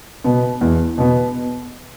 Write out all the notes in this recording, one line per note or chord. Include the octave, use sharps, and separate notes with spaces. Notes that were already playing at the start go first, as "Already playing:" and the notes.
B2 B3
E2
B2 B3